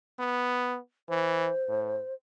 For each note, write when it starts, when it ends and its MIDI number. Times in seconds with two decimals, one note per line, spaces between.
0.19 0.78 59
1.09 1.50 52
1.09 2.14 72
1.68 2.01 45